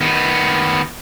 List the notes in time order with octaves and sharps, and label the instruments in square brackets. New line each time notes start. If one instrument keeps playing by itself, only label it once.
[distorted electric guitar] D#3 B3